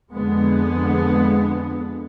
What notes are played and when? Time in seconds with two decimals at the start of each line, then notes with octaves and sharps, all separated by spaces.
0.14 F2 D3 G#3 B3